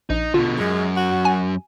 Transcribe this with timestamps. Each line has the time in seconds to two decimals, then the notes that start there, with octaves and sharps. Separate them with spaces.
0.10 A#1 D#4
0.34 B2 D3 F4
0.59 F#2 G#3
0.97 F#4
1.25 G#5